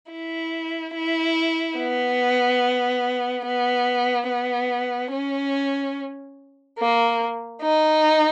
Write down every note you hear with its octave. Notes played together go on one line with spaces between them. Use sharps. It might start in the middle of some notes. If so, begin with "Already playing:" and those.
E4
E4
B3
B3
B3
C#4
A#3
D#4